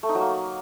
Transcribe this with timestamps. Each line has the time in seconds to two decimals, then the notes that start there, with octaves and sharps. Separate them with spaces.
0.03 A3
0.09 D#4
0.15 F#3
0.21 A#3